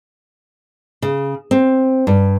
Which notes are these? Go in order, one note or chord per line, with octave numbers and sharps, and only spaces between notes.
C#3
C4
G2